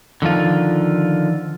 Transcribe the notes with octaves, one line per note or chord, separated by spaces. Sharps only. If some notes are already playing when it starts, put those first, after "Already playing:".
D3 D#3 F3 F4